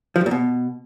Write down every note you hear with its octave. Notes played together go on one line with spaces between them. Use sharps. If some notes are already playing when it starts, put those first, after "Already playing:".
F3
G2
A#2
B2